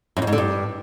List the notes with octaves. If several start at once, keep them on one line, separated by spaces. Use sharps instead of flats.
F#2
F2
G#2
D3
G2